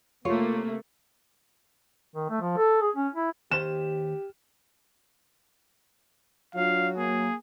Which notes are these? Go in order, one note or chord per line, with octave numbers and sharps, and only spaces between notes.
C3 A3 A#3 F4 C#5
D#3
A3
F3
A4
G#4
C#4
E4
D#2 G4 C5 E7
F#3 D4 F4 F5
A#3 G#4